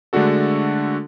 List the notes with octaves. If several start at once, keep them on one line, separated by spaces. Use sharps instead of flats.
D3 G#3 A3 D4 F#4 A4